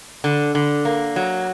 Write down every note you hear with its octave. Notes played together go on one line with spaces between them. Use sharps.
D3
D3
A#3
F#3